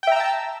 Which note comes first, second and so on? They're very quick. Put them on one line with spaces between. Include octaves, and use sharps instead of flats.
G5 E5 A#5 E6 A5